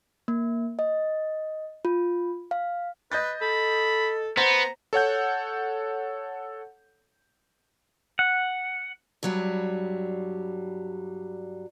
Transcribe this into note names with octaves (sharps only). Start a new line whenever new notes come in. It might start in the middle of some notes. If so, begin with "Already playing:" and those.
A#3
D#5
F4
F5
B4 D#5 G6 A6
A4 B5
B3 C5 A#5
A4 C#5 F#5 G6
F#5
G2 F#3 G3